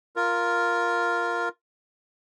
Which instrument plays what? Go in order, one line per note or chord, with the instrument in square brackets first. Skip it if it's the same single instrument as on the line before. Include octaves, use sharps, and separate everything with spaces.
[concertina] F4 A#4